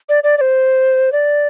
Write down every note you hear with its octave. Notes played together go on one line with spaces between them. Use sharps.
D5
D5
D5
C5
D5